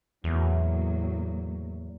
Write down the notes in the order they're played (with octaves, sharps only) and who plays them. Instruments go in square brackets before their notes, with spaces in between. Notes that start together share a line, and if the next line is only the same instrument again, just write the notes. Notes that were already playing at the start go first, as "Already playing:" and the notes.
[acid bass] E2 [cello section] A2 F#3 A#3